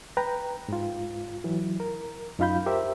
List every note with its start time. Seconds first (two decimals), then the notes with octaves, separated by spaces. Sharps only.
0.17 B4 G5 A#5
0.69 G#2 F4
1.44 E3 F#3
1.80 A#4
2.39 F#2 D#4 F4 F5 B5 G6
2.66 G4 A#4 C5 E5